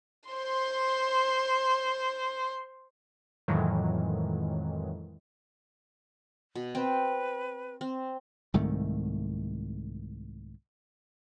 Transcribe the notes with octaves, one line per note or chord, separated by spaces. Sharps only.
C5 C6
F2 A2 D#3 E3 F#3 G#3
B2
C4 B4 G5
C4
C2 G#2 D#3 A3